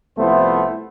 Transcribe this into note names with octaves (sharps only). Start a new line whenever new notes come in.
C2 F3 A3 B3 E4 C5